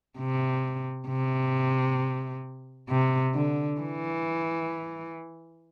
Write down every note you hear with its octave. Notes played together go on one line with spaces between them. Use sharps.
C3
C3
C3
D3
E3